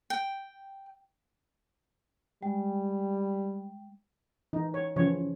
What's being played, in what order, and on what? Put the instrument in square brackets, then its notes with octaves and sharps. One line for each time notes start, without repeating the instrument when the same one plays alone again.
[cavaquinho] G5
[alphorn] G3 [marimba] G#3 [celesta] G5
[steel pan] E3 D#4
C#5
C#3 E3 F3 C#5